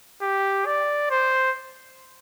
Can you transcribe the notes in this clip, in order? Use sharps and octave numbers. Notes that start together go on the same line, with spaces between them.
G4
D5
C5